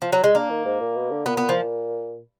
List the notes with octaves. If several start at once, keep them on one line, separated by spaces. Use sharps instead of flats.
F3
F#3
G#3
A#3 D4
D#3
G#2
A#2
B2
D3
A#2 B3
B3
F3